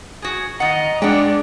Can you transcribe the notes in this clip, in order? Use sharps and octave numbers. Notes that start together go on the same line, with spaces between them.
F#4 G#4
D#3 D#5 F#5 A#5
G#3 D4 D5 F#5 G5